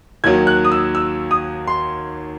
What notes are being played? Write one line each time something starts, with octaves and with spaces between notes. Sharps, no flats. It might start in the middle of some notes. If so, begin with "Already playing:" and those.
D#2 D#3 F#3 G#6
F#6
D#6
E6
E6
D#6
C6